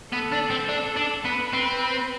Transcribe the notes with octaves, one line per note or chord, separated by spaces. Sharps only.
B3 A4
D4
C4
D4
D4
B3 B4
C4